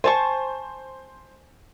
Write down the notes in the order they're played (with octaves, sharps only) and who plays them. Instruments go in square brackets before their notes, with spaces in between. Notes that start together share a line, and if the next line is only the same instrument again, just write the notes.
[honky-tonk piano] C5 [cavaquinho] G#5 A5 C#6